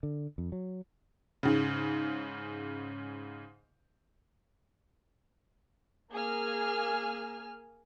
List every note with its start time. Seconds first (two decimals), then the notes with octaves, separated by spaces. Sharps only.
0.03 D3
0.38 F2
0.52 F#3
1.43 G#2 C#3
6.12 A#3 G#4 G#5 F6